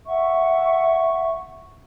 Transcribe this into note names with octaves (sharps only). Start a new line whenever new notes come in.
E5 F#5 C#6